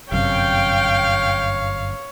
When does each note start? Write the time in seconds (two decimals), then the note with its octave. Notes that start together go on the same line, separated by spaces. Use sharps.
0.12 G1 F#2 C3 C#5 F5 G5